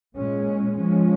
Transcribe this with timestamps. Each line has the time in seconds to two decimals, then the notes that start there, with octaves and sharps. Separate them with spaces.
0.17 A#2 G#3 C#4
0.77 F3 G#3 C#4